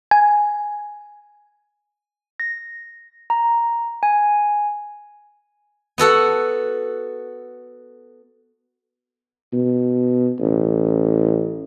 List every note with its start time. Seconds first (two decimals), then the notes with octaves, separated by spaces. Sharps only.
0.11 G#5
2.40 A#6
3.30 A#5
4.03 G#5
5.98 B3 F#4 A4 F#5
9.53 B2
10.40 A1